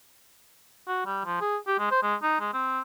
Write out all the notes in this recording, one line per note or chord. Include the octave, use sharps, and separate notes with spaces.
F#4
G3
F3
G#4
G4
G#3
C5
G#3
D#4
G#3
C4